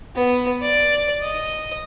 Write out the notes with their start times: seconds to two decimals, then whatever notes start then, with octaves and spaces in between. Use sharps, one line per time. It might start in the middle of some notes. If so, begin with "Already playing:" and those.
0.15 B3
0.62 D5
1.22 D#5